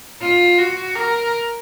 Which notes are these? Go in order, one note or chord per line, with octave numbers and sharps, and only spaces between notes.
F4
F#4
A#4